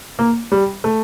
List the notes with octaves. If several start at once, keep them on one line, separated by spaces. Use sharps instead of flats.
A#3
G3
A3